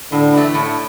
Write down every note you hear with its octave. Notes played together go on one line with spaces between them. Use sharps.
A2 D3
E3 A3
A2